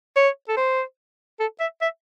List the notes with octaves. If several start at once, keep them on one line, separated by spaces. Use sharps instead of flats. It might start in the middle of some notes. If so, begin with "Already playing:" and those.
C#5
A4
C5
A4
E5
E5